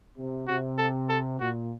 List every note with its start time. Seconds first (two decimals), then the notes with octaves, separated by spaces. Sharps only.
0.17 C3
0.47 C3 F#4
0.78 A4
1.09 A4
1.40 A#2 F#4